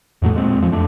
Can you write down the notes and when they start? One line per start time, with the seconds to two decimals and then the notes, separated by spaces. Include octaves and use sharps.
0.22 E2 A2 F#3 A3
0.34 A#2 G#3 C4
0.59 E2 F3
0.72 F2 A3 D4